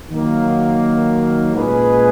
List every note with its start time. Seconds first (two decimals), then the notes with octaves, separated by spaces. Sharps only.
0.10 D#3 F#3 A#3
1.54 A#2 G#3 C#4 G#4 B4